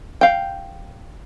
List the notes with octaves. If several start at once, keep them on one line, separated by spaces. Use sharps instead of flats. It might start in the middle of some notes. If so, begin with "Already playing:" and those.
F5 G5